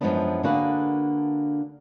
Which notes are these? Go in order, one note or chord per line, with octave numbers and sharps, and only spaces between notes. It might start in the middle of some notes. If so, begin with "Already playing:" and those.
F#2 A2 F3 G#3 B3 D4
D3 A#3 D4 F#4 G#4 B4